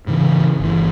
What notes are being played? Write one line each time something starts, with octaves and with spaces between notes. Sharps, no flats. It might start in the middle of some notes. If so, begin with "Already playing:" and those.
G#2 C#3 E3
G1 E3